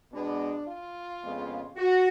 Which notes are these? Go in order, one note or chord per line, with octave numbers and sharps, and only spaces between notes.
B2 G#3 B3 D4
F4
F2 C#3 G#3 B3
F#4